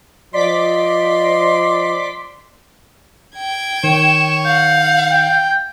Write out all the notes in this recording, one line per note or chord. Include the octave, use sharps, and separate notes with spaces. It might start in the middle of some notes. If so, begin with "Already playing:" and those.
F3 D5 D#5 C6 D6 B6
G5 G#6
D#3 C#5 E7
F5 F#5 G6
G5 G6